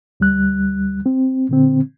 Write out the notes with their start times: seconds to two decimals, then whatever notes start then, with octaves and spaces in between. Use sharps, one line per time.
0.20 D2 G3 F#6
1.06 C4
1.49 A#2 D3 C4